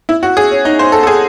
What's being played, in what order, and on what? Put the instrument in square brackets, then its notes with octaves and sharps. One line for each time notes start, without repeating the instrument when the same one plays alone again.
[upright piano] E4
F#4
G#4
C#4
D#4
C5
A4
A4
G#4